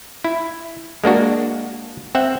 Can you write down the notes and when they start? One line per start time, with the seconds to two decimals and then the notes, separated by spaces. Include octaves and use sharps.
0.24 E4
1.04 G#3 A#3 D4 F#4
2.15 C4 E5 F#5